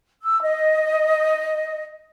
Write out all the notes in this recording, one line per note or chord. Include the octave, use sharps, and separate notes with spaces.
E6
D#5